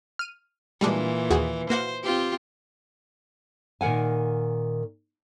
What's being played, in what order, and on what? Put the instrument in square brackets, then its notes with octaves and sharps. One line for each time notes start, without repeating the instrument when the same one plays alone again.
[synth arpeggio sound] F6 D#7
[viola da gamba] A#2 E3 [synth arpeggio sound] G3 G#3 D4
[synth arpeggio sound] D#2 F#4 G#4
[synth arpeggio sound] A#3 F#4 F5 [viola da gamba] C5
[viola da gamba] C4 F4 G4
[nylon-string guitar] A#2 D#3 A#4 F#5 G#5